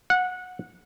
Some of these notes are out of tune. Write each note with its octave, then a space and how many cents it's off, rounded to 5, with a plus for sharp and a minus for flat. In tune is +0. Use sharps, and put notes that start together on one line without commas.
F#5 -20